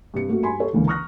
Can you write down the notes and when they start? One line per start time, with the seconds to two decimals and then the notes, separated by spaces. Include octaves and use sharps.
0.14 G2 C3 C#7
0.29 A3 A#3 F#4
0.43 G2 G#5 B5 C6
0.60 G4 A4 C#5
0.73 C#2 D3 E3 A#3
0.87 A#5 C#6 D#6 F6 F#6 A#6